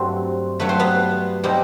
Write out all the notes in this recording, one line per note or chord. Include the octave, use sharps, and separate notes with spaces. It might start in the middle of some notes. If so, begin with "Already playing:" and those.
Already playing: G2 F#3 A3 C4 C5
G2 F#3 A3 B4
C5
B3 B4
B2 G3 C4 D#4